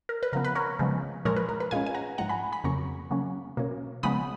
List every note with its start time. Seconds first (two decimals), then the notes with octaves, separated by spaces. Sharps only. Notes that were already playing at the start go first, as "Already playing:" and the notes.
0.09 A#4
0.23 B4
0.33 C#3 F3 B3 A#4
0.45 B4
0.55 A#4 C#5
0.79 C#3 F3 G#3 B3
1.25 A#2 F3 G#3 A#4 C#5
1.36 B4
1.49 A#4
1.60 B4
1.71 A#2 G#3 C#4 F5 G#5
1.86 G#5
1.94 F#5 A#5
2.18 G#2 F3 G#3 F#5 A#5
2.29 G#5 B5
2.52 G#5 B5
2.64 F2 C#3 F#3 A#3 C#4 A#5 C#6
3.10 C#3 F#3 A#3 C#4
3.57 B2 A#3 C#4
4.03 C#3 F3 G#3 B3 B5 D#6